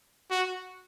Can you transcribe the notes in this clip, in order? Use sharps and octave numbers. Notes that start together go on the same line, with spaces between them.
F#4